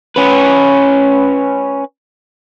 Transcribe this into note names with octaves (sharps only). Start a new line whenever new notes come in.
C#4 B4